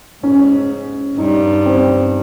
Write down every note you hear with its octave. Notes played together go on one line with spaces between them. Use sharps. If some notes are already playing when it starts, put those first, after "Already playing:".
G#2 C#4
G2 D#4
C4